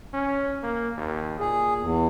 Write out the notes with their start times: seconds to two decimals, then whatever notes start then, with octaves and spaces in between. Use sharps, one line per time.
0.14 C#4
0.63 A#3
0.97 D#2
1.40 A#2 G#4
1.78 E2